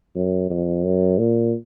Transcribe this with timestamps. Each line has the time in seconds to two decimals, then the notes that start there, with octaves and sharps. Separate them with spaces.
0.16 F#2
0.50 F2
0.84 F#2
1.18 A#2